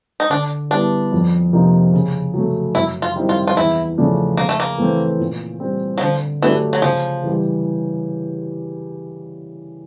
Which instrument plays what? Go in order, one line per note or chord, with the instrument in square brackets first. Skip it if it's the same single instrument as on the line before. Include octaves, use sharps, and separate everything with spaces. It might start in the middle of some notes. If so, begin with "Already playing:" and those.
[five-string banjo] D#4
[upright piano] D3 [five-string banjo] D4
[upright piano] G3 B3 E4 [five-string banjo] D4
[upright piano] F2
C3 F3 A#3 D#4
C#3
F#3 A3
[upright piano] F#2 [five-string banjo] E4
[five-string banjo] F4
[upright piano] D#3 G3 C4 E4
[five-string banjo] F4
F4
[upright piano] E2 [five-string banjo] E4
[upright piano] C#3 F3 A3 D4
[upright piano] C#3 [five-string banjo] A#3
[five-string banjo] A3
A#3
[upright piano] E3 A3 C4
A#2
G3 C4
[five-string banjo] F#3
[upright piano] D3 [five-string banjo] F3
[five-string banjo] E3 [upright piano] F#3 A3 D4 G4
[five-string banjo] F#3
[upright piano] C#3 [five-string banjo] F3
[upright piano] E3 G3